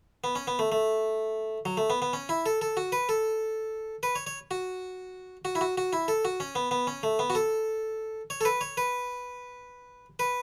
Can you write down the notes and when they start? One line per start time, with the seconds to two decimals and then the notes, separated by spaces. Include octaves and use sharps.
0.24 B3
0.35 C#4
0.47 B3
0.59 A3
0.72 A3
1.65 F#3
1.77 A3
1.90 B3
2.02 B3
2.13 C#4
2.29 E4
2.46 A4
2.61 A4
2.77 F#4
2.92 B4
3.09 A4
4.03 B4
4.15 C#5
4.27 C#5
4.51 F#4
5.45 F#4
5.55 E4
5.61 F#4
5.78 F#4
5.93 E4
6.08 A4
6.25 F#4
6.40 C#4
6.55 B3
6.71 B3
6.87 C#4
7.03 A3
7.19 B3
7.30 F#4
7.35 A4
8.30 C#5
8.41 A4
8.45 B4
8.61 C#5
8.77 B4
10.19 B4